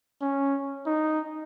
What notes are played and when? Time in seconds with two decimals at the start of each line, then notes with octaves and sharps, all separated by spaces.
0.22 C#4
0.86 D#4